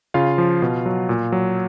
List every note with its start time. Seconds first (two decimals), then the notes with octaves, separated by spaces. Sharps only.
0.14 C#3 F4 F5
0.38 F3
0.62 B2
0.86 F#3
1.09 A#2
1.32 F#3